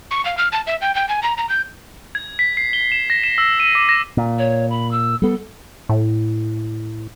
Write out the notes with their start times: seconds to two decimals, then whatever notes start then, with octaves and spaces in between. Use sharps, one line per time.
0.11 C#6
0.25 F5
0.38 F6
0.52 A5
0.67 E5
0.81 G5
0.95 G5
1.09 G#5
1.23 A#5
1.38 A#5
1.49 G6
2.15 G#6
2.39 B6
2.57 C7
2.73 G7
2.92 E7
3.10 A#6
3.24 E7
3.38 E6
3.60 D#7
3.75 D6
3.89 A#6
4.17 A#2
4.39 C#5
4.70 B5
4.91 E6
5.22 G3 B3 A4
5.89 A2